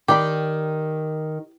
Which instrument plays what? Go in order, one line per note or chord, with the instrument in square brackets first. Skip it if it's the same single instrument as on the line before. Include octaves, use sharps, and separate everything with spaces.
[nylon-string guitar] D#3 [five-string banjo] G4 D5 B5